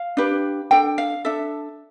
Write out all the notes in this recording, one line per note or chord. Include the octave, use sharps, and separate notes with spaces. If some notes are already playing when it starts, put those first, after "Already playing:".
Already playing: F5
D4 G4 B4
D4 A4 G5
F5
D4 A4 E5